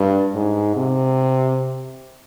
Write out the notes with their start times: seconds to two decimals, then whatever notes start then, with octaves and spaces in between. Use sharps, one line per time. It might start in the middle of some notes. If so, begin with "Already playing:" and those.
Already playing: G2
0.35 G#2
0.76 C3